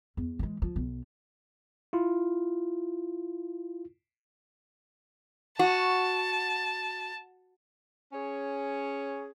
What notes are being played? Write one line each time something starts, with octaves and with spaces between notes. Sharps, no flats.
E2
E3 G#3
F3
B1
E4 F4
F#4 A5
C#4 G#4 C#5